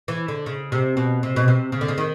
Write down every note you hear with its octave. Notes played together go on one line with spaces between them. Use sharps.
E3
D3
C#3
C3
B2
C3
B2
C3
C#3
D3
C#3
D#3